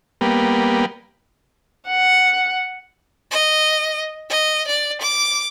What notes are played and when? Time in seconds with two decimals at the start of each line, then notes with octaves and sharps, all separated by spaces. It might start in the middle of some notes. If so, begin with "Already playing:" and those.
0.21 G3 A#3 B3
1.88 F#5
3.31 D#5
4.30 D#5
4.67 D5
5.01 D6